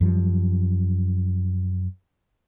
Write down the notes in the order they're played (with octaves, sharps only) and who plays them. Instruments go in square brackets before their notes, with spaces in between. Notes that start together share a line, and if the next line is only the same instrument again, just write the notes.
[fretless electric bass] F#2 F3 G3